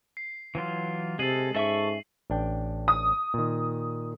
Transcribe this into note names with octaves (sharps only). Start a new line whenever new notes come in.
C7
E3 F#3 F4
C3 G#3 A4 C7 D#7 F#7
G#2 C#4 A4 E5 C#6
A1 D4 G5
D#6
A#2 D#3